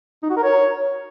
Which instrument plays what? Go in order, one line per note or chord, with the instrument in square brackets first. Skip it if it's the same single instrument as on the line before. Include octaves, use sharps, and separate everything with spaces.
[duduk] D#4
F#4
A#4
C#5